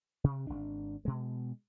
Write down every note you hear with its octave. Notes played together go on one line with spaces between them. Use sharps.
C3
G#1 D4
B2 G#3